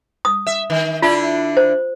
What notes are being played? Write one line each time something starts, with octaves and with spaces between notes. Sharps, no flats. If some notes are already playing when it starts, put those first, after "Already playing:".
D#6
E5
D#3
D3 D4 E4 F4
C5